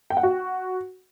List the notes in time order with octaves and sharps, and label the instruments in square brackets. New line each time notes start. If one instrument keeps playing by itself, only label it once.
[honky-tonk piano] G5
F#5
F#4